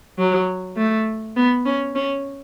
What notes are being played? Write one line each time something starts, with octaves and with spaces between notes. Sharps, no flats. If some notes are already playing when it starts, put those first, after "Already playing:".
F#3
A3
B3
C#4
C#4